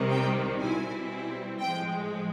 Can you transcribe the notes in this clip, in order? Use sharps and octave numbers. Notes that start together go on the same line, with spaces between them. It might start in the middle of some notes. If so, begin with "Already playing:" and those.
Already playing: C2 C3 D#3 G3
G5
B2 G3 C4 E4 G#5
A2 F3 G#3 G5